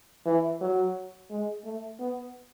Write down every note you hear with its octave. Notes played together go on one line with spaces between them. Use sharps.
E3
F#3
G#3
A3
B3